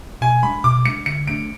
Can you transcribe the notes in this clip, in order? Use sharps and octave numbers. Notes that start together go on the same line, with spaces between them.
B2 G#5
G#3 D4 B5
B2 D6
G#3 D4 C#7
D3 C#7
A3 D4 D7